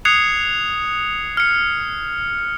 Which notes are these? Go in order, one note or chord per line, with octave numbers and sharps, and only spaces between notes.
D#6 F#6 G#6 C7 C#7 F7
F6 C#7